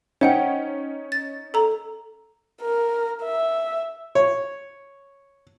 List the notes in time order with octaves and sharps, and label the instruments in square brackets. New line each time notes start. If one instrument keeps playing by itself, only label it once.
[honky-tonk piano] C#4 D#4 [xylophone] C5 F#5 G5
[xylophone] A6
A4 A#5
[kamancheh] A#4
E5
[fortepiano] C#5